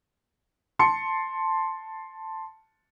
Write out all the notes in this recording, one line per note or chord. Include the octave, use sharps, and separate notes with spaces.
A5 C6 C#7